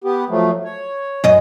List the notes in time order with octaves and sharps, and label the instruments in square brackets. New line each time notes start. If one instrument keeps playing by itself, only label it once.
[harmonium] B3 G4
F3 F#3 A3
C#5
[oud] F#2 D#5